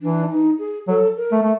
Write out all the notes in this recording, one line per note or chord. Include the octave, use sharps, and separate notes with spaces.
E3 D4
D#4
G#4
F#3 A4
A#4
A3
A3